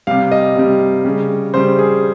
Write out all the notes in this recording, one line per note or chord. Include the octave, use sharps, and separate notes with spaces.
C3 G3 F5
D#5
C3 G3
C#3 G3
C#3 G3 C5
G#4